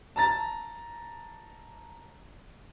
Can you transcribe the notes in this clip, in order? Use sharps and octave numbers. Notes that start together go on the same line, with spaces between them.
A5 A#5 A6